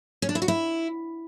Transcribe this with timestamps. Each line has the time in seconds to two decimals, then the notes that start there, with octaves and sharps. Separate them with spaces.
0.22 C#4
0.29 D4
0.35 E4
0.42 F#4
0.48 E4